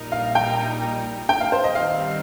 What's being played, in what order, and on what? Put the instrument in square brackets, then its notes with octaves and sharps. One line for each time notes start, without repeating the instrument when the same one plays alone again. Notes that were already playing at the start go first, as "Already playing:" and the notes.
Already playing: [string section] A#1 A#2 G3 D#4 A#4
[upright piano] F5
G5
G5
F5
C5
D#5
[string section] G2 D#3 G3 C4 D#4 [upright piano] F5